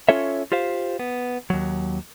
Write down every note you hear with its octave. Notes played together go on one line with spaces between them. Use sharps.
C#4 F4 A4 C#5 E5
F4 G4 C5 F5
B3
D#2 F#3